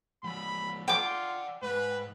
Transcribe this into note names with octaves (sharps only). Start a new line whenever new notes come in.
F3 G#3 B5
F4 D5 F#5 G5 D6
G#2 B4